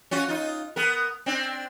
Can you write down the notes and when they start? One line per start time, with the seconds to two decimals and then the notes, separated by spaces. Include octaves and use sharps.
0.11 C#4 F4 F#4
0.28 D#4 F4
0.76 B3 A#4
1.26 C4 D4